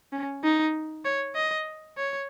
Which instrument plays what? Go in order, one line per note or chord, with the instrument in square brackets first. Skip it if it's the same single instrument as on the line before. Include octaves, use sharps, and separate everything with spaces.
[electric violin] C#4
D#4
C#5
D#5
C#5